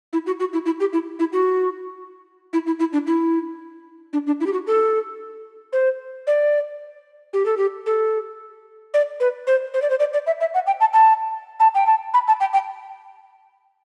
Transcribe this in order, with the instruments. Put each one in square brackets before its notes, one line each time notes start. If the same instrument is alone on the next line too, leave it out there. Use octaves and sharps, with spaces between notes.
[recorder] E4
F#4
F#4
E4
E4
G4
E4
E4
F#4
E4
E4
E4
D4
E4
D4
D4
E4
G4
F#4
A4
C5
D5
G4
A4
G4
A4
D5
B4
C5
C5
D5
C5
D5
D5
E5
E5
F#5
G5
A5
A5
A5
G5
A5
B5
A5
G5
G5